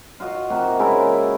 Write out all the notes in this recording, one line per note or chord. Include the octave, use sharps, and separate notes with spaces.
F4 F#4 D#5 F5
C3 A#3 F#4
C#3 G#3 E4 A#4